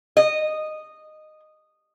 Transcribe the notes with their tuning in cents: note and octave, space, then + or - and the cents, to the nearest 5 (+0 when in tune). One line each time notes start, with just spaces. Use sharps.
D#5 -10